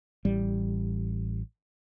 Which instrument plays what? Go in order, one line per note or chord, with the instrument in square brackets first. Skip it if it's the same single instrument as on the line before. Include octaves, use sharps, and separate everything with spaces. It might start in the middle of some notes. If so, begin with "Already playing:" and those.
[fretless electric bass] A1 G3